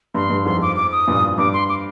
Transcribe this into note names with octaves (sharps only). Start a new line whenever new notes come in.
G2 C6
G2
F2 G#2 C6
D6
D6
D#6
G2 A#2
G2 D6
C6
D6